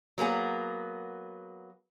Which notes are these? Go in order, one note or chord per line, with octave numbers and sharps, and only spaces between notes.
F#3 A#3 B3 G#4